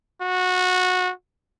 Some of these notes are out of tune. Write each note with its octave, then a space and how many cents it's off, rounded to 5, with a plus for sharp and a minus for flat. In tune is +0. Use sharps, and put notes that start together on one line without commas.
F#4 -20